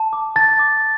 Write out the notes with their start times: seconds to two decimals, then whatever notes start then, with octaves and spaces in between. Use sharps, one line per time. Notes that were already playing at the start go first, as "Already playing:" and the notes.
Already playing: A5
0.13 D6
0.36 A5 A6
0.59 D6